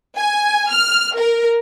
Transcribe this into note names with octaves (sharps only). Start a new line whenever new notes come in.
G#5
F6
A#4